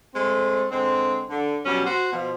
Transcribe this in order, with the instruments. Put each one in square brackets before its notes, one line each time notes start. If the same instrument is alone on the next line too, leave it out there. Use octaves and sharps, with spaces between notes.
[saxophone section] G#3 A3 C4
D3 G#3 C4
D3
B2 F#3 G3 C#4
F#4 C5
B2 F3